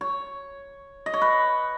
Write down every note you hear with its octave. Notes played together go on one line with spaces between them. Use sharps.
C#5
D#5
C#5
B4